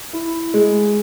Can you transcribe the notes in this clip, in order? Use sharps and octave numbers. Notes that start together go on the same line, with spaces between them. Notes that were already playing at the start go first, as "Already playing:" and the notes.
E4
G#3